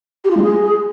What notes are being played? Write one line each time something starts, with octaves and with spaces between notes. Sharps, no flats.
G4
F4
G#3
G#4